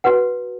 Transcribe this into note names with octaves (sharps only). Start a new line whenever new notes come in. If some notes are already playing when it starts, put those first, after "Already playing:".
F#4 B4 F#5